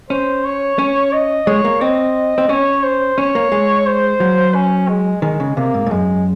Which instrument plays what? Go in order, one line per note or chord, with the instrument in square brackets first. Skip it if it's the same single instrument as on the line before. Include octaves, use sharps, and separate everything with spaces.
[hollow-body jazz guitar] C#4 [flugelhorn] C5
[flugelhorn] C#5
[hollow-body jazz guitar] C#4
[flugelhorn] D#5
[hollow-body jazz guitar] G#3 [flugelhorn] C#5
[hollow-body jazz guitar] A#3
[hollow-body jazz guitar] C4 [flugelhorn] D#5
[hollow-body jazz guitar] C4
[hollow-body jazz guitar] C#4 [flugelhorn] C#5
[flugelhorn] C5
[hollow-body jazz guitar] C#4 [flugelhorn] C#5
[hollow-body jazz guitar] A#3
G#3
[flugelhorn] C5
[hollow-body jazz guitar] F#3
[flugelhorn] C#4
G#3
[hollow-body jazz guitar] D#3 [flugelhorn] G#3
[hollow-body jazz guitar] C#3
[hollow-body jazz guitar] C3 [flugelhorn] A#3
[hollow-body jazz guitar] G#2
G#2
[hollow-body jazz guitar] F#2 [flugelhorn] G#3